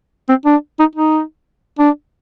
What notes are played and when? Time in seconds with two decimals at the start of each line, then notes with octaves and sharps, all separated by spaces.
0.29 C4
0.45 D4
0.79 D#4
0.96 D#4
1.79 D4